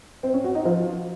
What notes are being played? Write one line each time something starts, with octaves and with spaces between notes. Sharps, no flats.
C4
C#4
F#4
D#4
F3